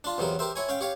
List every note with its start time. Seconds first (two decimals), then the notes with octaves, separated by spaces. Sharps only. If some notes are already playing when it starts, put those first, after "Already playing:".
0.04 D4 F4
0.18 E2 C3 F#3 B3 A#4
0.39 G4 A#4 C5 E5
0.56 E4 C#5 G#5
0.69 C#4 F5 G5
0.81 G4 C#5 F5